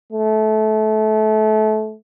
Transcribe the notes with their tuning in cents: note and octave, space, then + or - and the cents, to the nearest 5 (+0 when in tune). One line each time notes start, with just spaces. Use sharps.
A3 -25